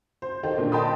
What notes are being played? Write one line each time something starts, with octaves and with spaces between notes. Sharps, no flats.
C5
D#3 D#4 G4 A4 C5
A#2 D3 A#3
D#5 G5 A5 B5 C6 D#6